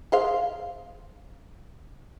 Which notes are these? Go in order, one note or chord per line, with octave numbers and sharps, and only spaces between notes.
G#4 C5 F5